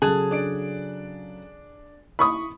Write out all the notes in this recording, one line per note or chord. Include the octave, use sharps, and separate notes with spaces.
C#3 F#3 G#4 A4 A5 F#6
D4 D5 D7
E4 B5 C#6 D#6